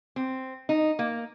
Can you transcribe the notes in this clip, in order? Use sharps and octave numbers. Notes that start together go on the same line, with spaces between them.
C4
D#4
A#3